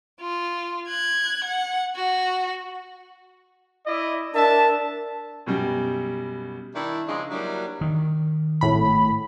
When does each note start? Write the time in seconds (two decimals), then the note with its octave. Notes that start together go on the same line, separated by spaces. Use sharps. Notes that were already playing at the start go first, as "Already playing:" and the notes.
0.21 F4
0.88 F#6 G#6
1.44 F#5
1.96 F#4
3.86 E4 D5 D#5
4.34 D4 A#4 E5 A5
5.46 F#2 B2 G3
6.75 D#3 D4 E4
7.07 C#3 F3 G#3 D4 D#4
7.31 F#3 G3 A#3 D4 E4
7.81 D#3
8.61 G#1 A2 B5